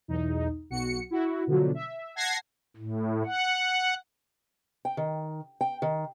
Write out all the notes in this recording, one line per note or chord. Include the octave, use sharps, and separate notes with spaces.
B1 E2 D#4
B1 F#4 C#7
E4 F#4
B2 D3 F3 F#3
E5
F#5 A5 G#6 A#6 C7
A2
F#5
G5
D#3
G5
D#3